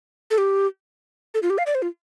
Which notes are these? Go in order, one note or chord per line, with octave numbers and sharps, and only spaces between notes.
A4
G4
A4
F4
G4
F5
D5
C5
F4